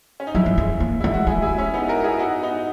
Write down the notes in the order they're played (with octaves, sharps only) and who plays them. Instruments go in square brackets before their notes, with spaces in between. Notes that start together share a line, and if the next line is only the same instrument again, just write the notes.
[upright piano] C#4
D#4
[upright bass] F#3 [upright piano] C#4 E4
[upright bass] G#3
G#3
A#3
[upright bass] G#3 [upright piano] E4
[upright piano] F#4
[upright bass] G#3 [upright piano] E4 G#4
[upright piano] E4 G#4
C#4 E4
B3 D#4
F#4 A#4
E4 G#4
D#4 F#4
B3 D#4